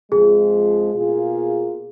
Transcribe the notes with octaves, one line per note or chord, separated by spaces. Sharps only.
F2 F3 G#3 G#4
B2 A#3 F4 G#4